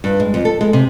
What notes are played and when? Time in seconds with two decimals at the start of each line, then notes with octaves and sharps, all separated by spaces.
0.04 G2
0.20 G#3
0.34 F2
0.45 A4
0.61 G#3
0.73 C3